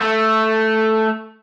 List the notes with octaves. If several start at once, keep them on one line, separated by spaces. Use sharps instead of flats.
A3